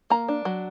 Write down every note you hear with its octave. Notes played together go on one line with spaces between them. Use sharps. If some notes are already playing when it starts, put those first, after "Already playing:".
A#3 A#5
D4
F#3